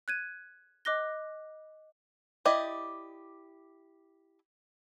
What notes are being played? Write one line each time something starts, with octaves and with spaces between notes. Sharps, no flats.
F#6 G#6 D#7
D#5 D6 F#6 A#6 G7
E4 G4 D5 D#5